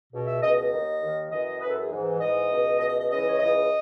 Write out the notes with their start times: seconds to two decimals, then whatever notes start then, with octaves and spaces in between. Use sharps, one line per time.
0.12 C#2 B2
0.27 E5
0.41 C#2 B2 D#5
0.56 D#5
0.72 D#2 D#3
1.01 D#2 D#3
1.30 F#2 E3 D#5
1.61 F#2 E3 B4
1.71 A4
1.81 G#4
1.90 G#2 E3
2.20 G#2 E3 D#5
2.50 C#2 B2
2.79 C#2 B2 D#5
2.90 D#5
3.00 D#5
3.10 C#2 C#3 E3 D#5
3.29 C#5
3.39 C#2 C#3 E3 D#5